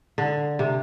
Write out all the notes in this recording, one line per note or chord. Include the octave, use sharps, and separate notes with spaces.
D3
C3